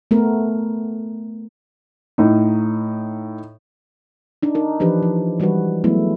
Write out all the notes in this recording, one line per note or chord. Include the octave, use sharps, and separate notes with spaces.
A3 B3 A#4
A2 D#4
D4 D#4
D#4 A#4
E3 F3 D4 G4 B4
F3
E3 G3 G#3 F#4 B4
F#3 G#3 A3 B3 E4